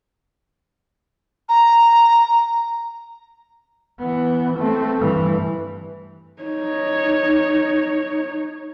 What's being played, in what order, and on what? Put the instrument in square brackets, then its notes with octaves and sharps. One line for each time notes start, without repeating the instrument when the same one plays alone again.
[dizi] A#5
[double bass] E3 B3
A3 C4
G2 E3
[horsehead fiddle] D#4 C#5